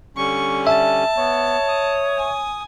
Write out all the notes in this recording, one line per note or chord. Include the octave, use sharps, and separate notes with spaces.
D3 G3 C#4 C#6
E5 A5
B3 C#5
D#6
G#5